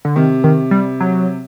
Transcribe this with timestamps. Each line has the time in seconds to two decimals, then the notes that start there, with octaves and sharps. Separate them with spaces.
0.05 D3
0.16 C3 D#3
0.44 D#3
0.71 G3
1.00 F#3